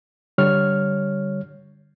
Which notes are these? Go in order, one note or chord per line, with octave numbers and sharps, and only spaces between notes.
D3 G3 C#5 F6